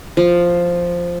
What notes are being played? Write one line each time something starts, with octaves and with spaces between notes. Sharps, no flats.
F3